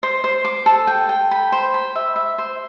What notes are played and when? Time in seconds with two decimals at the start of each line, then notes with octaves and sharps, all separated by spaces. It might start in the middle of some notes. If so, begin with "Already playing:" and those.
0.03 C5
0.24 C5
0.45 D6
0.66 A4
0.87 G5
1.09 G5
1.31 B5
1.52 C5
1.74 B5
1.96 E5
2.16 E5
2.38 C5